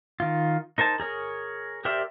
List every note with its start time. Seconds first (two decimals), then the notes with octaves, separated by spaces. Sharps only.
0.20 D#3 F4
0.78 D#4 A#4 C5 A5
1.00 G#4 A#4 C#5
1.85 G4 A#4 C5 D5 E5